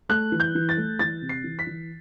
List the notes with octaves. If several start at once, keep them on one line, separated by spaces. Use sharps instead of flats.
A3 F#6
E3
G6
E3
A6
A3
E3 A6
C3
C7
E3
B6
E3